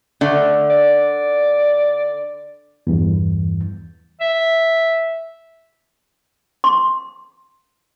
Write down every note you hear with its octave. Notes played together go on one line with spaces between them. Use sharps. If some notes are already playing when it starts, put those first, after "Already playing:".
D3 A3
D5
E2 G2 E3
E5
C6